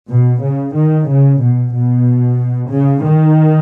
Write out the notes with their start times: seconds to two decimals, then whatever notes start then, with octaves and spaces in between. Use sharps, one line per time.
0.10 B2
0.43 C#3
0.75 D#3
1.08 C#3
1.41 B2
1.73 B2
2.70 C#3
3.03 D#3